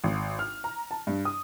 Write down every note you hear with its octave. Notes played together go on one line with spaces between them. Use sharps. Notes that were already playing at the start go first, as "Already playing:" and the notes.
G#1
F6
A#5
A5
G2
D#6